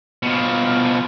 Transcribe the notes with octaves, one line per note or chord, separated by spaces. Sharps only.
B2 F3